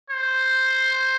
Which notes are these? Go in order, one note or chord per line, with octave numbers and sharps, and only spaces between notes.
C5